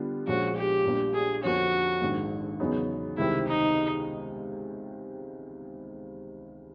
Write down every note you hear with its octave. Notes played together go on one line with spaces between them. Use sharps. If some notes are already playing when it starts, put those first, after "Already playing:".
Already playing: D3 G3 B3 D4 F4
A#1 A#2 F3 G#3 C#4 F#4
G4
A#1 A#2 G3 A#3
G#4
F2 D3 F3 A#3 C#4 F#4
A#1 G#2 D#3
E2 C#3 F#3 B3 D#4
C#2 C3 D#3 G3 C4 E4
D#4